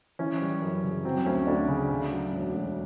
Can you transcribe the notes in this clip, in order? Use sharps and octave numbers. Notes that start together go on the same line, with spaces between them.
E3 C#4
G3
F#2
C#3
F#3 C4
D2 C#4
D2 D4
C#3
C#3
F#3
E1
D2